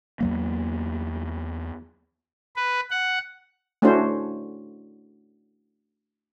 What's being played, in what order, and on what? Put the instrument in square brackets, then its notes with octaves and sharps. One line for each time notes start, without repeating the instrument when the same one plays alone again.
[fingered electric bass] E2 F#3 A#3
[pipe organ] B4
F#5
[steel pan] A3 C#4 D4 E4 F#4 C5